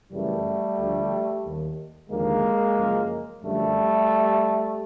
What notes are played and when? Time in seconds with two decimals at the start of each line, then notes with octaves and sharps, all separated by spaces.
0.11 F#2 C#3 E3 G3 A3
0.77 D2 D3 F3
1.44 D#2 D#3
2.10 D#2 D3 F3 G#3 A#3
2.76 F#2 C#3 F3
3.42 F#2 D3 F3 G3 A3